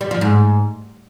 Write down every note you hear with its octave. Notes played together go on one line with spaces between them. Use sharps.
G3
F3
G#2